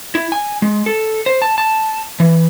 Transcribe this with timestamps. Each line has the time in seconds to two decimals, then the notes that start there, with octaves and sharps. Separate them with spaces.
0.15 E4
0.32 G#5
0.62 G#3
0.86 A4
1.26 C5
1.42 A5
1.58 A5
2.20 E3